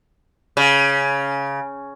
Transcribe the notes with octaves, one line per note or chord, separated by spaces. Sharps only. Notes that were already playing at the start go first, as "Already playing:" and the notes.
C#3